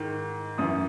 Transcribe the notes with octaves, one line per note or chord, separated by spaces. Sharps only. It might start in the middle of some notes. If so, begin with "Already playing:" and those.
Already playing: G#2 D#3
F#2 E3 D#6